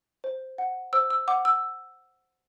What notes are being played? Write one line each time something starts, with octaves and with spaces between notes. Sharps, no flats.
C5
F#5
C5 E6
E6
F#5 D6
E6